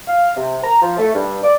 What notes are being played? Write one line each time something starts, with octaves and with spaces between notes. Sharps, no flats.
F5
C3
A#5
F3
A3
G2
D5